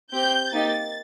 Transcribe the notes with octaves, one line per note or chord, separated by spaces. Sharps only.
C4 G4 G6
A#3 D#4 G4 A6